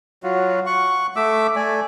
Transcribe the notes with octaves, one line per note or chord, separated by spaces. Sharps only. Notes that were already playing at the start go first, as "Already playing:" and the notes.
F#3 F4 F#4
F#5 C#6
A3 E5 D6 E6
A3 D5 G#5